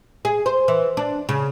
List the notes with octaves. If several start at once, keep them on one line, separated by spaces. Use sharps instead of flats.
G#4
C5
E3
D4
C#3